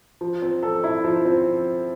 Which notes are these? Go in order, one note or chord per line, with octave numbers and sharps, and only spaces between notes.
F3
C4
A4
E4
F3
C4